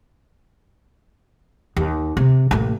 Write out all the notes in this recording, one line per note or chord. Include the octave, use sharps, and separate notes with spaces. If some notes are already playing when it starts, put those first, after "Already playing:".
D#2
C3
A1 A#3